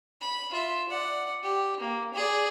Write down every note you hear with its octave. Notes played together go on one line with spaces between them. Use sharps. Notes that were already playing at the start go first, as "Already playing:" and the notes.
B5
F4 E5
D5 F#5
G4
A#3
G#4 D5